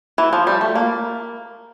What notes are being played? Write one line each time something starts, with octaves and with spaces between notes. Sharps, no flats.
E3
F3
G3
A3
A#3